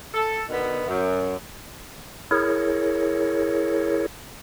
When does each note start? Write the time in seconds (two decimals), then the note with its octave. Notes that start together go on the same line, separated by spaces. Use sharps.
0.14 A4
0.49 B2 D3 D#3 B3
0.87 F#2
2.31 E4 G#4 A#4 C#5